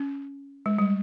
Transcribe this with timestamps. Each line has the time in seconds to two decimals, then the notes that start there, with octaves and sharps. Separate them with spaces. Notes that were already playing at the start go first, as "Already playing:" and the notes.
Already playing: C#4
0.66 G#3
0.78 G3